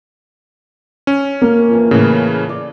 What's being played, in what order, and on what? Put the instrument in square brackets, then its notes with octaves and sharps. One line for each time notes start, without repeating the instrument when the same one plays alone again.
[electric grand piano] C#4
[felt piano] A#3 [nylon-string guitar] F#4 A#4
[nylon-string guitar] F2 E3
[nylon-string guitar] A2 [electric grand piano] C#3 E3
[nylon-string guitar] D5